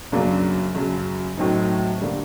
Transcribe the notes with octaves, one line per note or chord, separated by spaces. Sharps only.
F#2 C#3 F#3 A#3 D4
F#2 C#3 F#3
A2 F#3 A3 C4 D#4
D3 G3 A#3